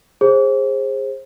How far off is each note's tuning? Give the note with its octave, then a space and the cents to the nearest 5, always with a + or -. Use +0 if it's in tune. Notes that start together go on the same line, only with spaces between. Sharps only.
G#4 -20 C5 +30